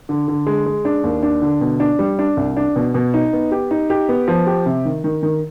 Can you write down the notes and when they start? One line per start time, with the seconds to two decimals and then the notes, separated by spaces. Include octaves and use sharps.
0.09 D3
0.28 D3
0.47 G#3
0.66 G#3
0.85 D4
1.04 D#2
1.23 D4
1.42 D3
1.61 B2
1.80 D4
1.99 G3
2.19 D4
2.37 C2
2.57 D4
2.76 B2
2.94 B2
3.14 D#4
3.33 B3
3.52 G4
3.71 D#4
3.90 G4
4.09 B3
4.28 F3
4.47 G4
4.66 C3
4.85 D#3
5.04 D#3
5.23 D#3